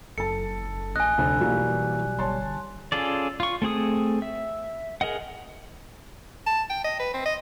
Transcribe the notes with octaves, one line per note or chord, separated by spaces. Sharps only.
F#1 A4 A5 C#7
A#1 D#5 G#5 F#6
F1 D2 D4
B1 E3 F#3 G3 A#3
G1 C#5 A5 C6
C#4 F4 G#4 A4 D5
F4 C#6
A3 C4 G#4 D#6
E5
G#4 A#4 D#5 F#5
A5
G5
D#5
B4
C4
D#5